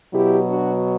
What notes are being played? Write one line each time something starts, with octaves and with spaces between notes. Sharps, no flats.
B2 F#3 E4 G4
D4 F#4